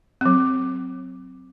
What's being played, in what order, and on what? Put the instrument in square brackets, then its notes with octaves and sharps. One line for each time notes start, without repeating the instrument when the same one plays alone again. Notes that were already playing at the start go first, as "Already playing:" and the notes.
[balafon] F#3 C4